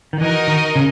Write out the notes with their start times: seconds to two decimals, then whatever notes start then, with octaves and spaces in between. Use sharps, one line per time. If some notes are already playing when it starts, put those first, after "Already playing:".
0.13 D#3
0.20 E3 D#4 F#4 A#4 D#5
0.48 D#3
0.76 C#3